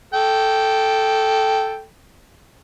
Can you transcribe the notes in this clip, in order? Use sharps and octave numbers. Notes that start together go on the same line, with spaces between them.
A4 G5